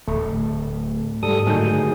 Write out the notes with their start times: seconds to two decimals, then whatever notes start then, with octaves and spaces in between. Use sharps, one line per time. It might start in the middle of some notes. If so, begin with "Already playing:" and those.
0.08 D1 A3
1.23 G#2 G3 A4 D#6
1.47 A2 D3 D#3 F#3 A3 D#4 G#4 G6